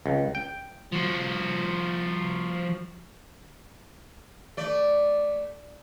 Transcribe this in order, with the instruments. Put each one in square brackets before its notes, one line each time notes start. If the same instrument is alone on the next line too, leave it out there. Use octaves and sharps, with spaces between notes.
[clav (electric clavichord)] C#2
G5
[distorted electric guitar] F3 F#4
[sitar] A3 D5